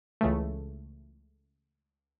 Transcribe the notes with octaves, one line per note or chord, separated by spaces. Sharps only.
C#2 C#3 E3 A3